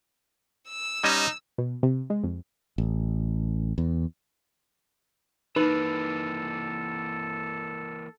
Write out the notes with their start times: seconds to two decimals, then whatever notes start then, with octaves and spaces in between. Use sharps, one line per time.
0.70 E6
1.04 G3 C#4 D#4 D#5
1.58 B2
1.83 C3
2.10 G#3
2.24 F2
2.78 A1
3.78 E2
5.56 E3 A#3 D#4 A4 B4